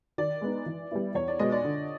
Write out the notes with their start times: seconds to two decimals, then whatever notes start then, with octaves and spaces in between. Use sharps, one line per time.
0.18 D#3 D5
0.41 G#3 B3 D#4
0.66 E3
0.91 G3 B3 E4
1.15 E2 C#5
1.28 D5
1.39 B2 G#3 B3 D#5
1.52 D5
1.64 D3